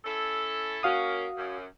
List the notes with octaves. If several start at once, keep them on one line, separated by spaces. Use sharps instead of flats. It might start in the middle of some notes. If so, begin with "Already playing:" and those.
C#4 E4 A4
A#3 C#4 F#4 F5 D#6
F#2